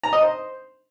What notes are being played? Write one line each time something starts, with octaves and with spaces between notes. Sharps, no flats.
A#5
D#5
C5